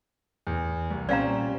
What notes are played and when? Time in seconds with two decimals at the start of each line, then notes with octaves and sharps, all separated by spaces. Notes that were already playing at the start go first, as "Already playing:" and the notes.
0.47 E2
0.90 C2
1.09 A#2 G3 C4 C#4 D5 F5 A#5